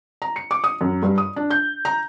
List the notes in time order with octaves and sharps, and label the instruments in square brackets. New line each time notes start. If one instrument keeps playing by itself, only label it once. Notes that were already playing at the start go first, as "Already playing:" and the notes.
[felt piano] A#5
C#7
D6
D#6
F#2
G2
D#6
D4
G6
A#5